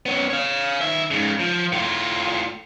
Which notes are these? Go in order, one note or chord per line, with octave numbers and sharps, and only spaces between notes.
B3 C#4
C#5 F5
D#3 E5
G#2 C#3
F3
A2 F4